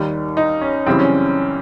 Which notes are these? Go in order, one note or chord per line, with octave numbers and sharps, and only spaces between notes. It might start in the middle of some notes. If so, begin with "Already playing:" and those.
Already playing: D#2 D#3 G3
D#4
C#4
F#2 C#3 E3 G3 C4
C#4